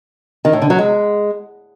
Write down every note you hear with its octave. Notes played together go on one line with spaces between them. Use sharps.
D#3
A2
D3
F#3
G#3